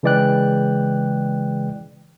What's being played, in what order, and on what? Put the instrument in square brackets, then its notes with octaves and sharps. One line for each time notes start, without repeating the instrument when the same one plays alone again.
[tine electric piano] C#3 E3 G#3 D5 G5 F#6